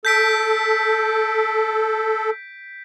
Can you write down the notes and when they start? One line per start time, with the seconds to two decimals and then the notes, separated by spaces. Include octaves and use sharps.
0.05 A4 G6 B6 D7